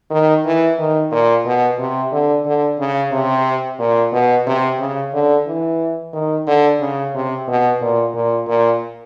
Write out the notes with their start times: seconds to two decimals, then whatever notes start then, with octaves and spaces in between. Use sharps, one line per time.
0.11 D#3
0.45 E3
0.78 D#3
1.11 A#2
1.46 B2
1.79 C3
2.12 D3
2.45 D3
2.79 C#3
3.12 C3
3.79 A#2
4.13 B2
4.47 C3
4.79 C#3
5.13 D3
5.47 E3
6.13 D#3
6.47 D3
6.81 C#3
7.15 C3
7.48 B2
7.81 A#2
8.14 A#2
8.47 A#2